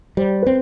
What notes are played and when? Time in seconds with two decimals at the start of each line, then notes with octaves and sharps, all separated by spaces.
0.17 G3 C5
0.43 B4
0.46 C4 C5